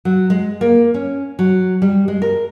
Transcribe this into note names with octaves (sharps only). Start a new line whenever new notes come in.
F#3
G#3
A#3
C#4
F#3
G3
G#3
A#4